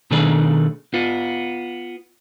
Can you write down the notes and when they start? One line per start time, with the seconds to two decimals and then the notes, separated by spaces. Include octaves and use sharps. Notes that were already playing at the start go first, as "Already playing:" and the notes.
0.11 B2 D#3 A3 D4 G#4 B4
0.94 B3 F4